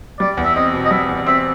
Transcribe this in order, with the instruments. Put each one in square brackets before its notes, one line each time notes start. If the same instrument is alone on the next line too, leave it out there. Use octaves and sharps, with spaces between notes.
[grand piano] G3 [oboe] D5
[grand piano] E2
[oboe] E5
[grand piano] C4 [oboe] D#5
[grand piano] B2
[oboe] D#5
[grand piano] G3 [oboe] E5
[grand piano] E2
[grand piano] C4 [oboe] E5